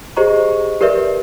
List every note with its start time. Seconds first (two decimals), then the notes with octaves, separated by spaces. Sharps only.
0.16 G4 G#4 C5 D#5 A#5 C#6
0.81 G4 A#4 B4 D5 E5